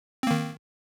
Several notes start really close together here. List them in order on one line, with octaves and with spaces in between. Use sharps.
C4 A#3 D#3